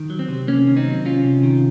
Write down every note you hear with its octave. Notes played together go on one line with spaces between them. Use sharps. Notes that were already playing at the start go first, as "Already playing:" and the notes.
Already playing: D#3
F#3
C4
C3
C3 A#3 C#4
D#3
C4 D#4
F#3
C3 C#4 F4
C3
D#3